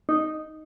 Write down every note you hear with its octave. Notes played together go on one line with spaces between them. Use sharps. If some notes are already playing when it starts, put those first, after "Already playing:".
D#4